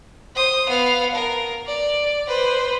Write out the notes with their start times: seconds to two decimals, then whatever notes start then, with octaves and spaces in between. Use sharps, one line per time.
0.35 C5 D#6
0.69 B3 F5
1.15 A#4
1.67 D5
2.28 B4 C5